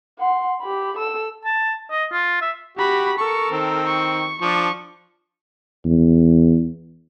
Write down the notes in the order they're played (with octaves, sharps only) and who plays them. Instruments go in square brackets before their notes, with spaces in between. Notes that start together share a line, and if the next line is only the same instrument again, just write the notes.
[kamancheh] F#5 C6
G4 B5
A4 E6
[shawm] A5
D#5
F4
E5
[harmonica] F#4 [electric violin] G4 B5
[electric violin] A4 A#4 [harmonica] C#6
[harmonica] D#3 C4
[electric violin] C#6
[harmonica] F3 D4 [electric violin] C#6
[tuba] E2